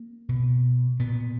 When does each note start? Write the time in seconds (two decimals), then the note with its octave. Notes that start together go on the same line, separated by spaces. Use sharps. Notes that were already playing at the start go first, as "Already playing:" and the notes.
Already playing: A#3
0.29 B2
0.99 A#2 B3